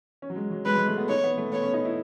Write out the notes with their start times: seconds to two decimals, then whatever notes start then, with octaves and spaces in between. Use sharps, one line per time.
0.22 C#4
0.30 F#3
0.36 G#3
0.51 F#3
0.66 G#3 B4
0.76 G#3
0.87 A3
0.98 B3
1.09 D#4 C#5
1.24 B3
1.37 A3
1.52 B3 C#5
1.63 C#4
1.74 D#4
1.85 E4